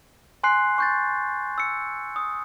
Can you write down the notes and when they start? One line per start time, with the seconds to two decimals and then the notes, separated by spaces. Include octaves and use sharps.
0.43 G#5 C6 F#6 C7
0.78 C#6 G6 A6
1.58 E6 C#7
2.16 D#6